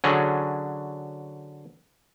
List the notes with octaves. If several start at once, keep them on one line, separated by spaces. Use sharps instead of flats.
D3 F#3 C#4 G#4